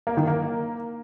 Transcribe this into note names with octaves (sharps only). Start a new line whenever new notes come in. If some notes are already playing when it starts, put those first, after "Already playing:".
A#3
D#3
A#3